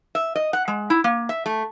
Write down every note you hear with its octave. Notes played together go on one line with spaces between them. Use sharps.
E5
D#5
F#5
G#3
E4
A#3
E5
A3